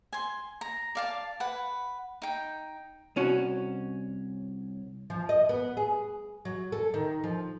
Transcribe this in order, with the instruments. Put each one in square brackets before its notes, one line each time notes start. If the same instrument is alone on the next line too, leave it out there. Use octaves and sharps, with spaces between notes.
[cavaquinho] G#5 C6
A#5
D5 F5 A5
B4 F#5 B5
D#4 G5
[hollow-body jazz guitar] C2 C#4 F#4
[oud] F3
D#5
B3
G#4
F#3
A4
D#3
F3